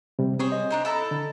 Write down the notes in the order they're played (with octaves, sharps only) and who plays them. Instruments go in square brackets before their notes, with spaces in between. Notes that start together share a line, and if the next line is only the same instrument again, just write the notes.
[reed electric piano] C3 G3
[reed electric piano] C4 [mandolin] G#4 C5 C#5
[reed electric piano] D#5
[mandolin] D4 D#4 C5
E4 A4 A#5
[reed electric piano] D3